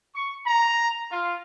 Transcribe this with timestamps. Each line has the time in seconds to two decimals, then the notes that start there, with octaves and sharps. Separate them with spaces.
0.15 C#6
0.47 A#5
1.11 F4